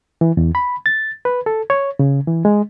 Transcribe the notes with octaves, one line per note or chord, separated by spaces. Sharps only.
E3
E2
B5
A6
B4
A4
C#5
C#3
E3
G#3